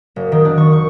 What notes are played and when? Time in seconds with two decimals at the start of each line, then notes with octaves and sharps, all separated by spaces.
0.16 F#1
0.32 D#3
0.45 D4
0.57 C#6
0.73 C#6